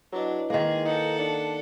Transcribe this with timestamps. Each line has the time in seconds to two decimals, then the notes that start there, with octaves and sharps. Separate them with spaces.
0.12 F#3 D4 E4 B4 D#5
0.50 D#3 G#3 A#3 G#4
0.85 D#4 A4 F#5
1.20 D4